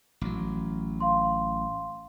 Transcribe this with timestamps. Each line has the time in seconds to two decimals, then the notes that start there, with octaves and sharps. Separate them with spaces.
0.21 A1 F#3
1.00 F5 C6